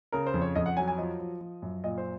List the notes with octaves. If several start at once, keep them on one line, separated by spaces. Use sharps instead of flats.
C#3 A#4
C5
F2
C#5
F2 D#5
F#5
F#3 G#5
G#5
F3 D#5
F3
F3
F#2
A#2 D#5
C5